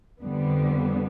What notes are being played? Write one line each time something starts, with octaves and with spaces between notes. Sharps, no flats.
F2 D3 G3 B3